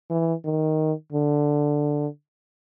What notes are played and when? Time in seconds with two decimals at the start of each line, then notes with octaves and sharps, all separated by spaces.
0.10 E3
0.45 D#3
1.12 D3